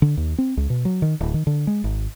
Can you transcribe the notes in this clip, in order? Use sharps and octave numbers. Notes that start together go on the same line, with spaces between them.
D3
D#2
C4
C#2
B2
F#3
D#3
D1
D#3
D3
G#3
G#1